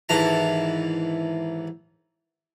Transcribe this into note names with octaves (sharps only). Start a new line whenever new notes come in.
D#2 G#2 E3 A5 A#5